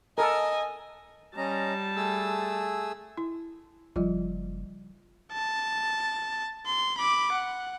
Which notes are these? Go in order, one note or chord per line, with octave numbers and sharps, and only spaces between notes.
A4 A#4 D#5 G#5
G3 C#4 D#5 A5 A#5
A3 G#4 E6
E4
F#1 F3 G3 F4
A5
C6
B5 D6
F#5